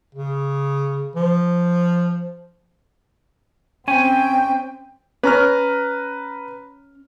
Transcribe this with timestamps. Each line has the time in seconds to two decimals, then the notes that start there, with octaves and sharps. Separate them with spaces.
0.15 C#3
1.15 F3
3.88 C4 C#4 C#5 G5 G#5
5.23 C#4 B4 A#5 F6